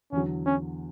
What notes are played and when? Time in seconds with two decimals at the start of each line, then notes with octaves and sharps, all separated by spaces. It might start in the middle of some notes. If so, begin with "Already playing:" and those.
0.12 E2 D3 F#3 C#4
0.46 C#4